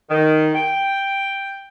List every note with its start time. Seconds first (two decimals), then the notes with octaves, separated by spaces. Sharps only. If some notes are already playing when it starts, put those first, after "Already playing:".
0.10 D#3
0.55 G5